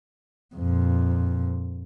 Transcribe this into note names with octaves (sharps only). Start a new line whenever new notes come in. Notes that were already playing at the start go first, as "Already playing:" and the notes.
F2 A#2